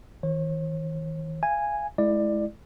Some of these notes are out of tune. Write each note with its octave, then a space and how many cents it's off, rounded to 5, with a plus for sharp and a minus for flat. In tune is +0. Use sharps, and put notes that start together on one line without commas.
D#3 +45 C#5 -45
F5 -30 G#5 -5
G#3 +35 E4 +0 D5 +20